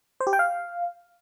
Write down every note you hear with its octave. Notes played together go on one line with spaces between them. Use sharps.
C5
G4
G5
F5